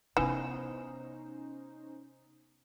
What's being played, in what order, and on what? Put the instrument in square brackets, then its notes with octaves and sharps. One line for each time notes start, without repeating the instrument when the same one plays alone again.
[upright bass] C3 B3 [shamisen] E3 [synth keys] C#4 D#4 C5 [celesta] G#5 E7